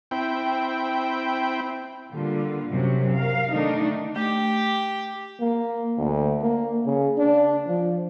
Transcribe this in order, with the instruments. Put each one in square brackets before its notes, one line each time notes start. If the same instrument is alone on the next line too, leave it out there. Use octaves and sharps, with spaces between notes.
[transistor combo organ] C4 E4 G5
[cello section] D3 G3 A#3 F4
F#2 C3 F#3 C4 C#4
A#4 F5
D3 D#3 A3 D4 D#4
[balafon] A3 [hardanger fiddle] G4
[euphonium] A#3
D2
A#3
C#3
D4
F3